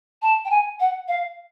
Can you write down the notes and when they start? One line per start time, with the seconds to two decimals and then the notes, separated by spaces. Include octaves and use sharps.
0.22 A5
0.45 G5
0.50 G#5
0.80 F#5
1.08 F5